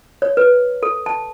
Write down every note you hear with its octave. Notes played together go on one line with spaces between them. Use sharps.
C#5
B4
A4
A5